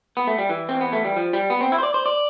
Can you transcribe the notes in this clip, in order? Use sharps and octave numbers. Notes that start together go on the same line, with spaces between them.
B3
A3
G3
E3
C4
B3
A3
G3
F3
G3
B3
C4
E4
C5
D5
C5
D5